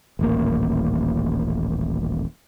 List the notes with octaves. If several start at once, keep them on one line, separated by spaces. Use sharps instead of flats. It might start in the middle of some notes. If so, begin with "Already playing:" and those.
D#1 A1 A#3